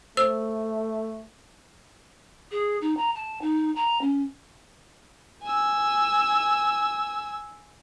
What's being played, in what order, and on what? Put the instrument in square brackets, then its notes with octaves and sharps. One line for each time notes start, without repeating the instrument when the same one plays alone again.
[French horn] A3 [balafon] C5 [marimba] E6
[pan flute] G#4
D#4
A#5
A5
D#4
A#5
C#4
[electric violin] G#5 E6